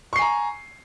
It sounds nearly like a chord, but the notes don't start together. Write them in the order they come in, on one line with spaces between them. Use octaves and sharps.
C#6 C7 G#5 A#5